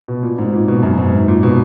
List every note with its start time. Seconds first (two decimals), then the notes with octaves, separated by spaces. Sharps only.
0.08 B2
0.23 A#2
0.38 G#2
0.53 A#2
0.68 B2
0.83 F#2
0.98 G#2
1.12 G#2
1.28 A#2
1.43 B2